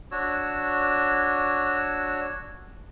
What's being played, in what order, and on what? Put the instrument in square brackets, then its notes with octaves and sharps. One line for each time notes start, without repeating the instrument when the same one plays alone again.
[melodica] D4 F#4 C#5 E6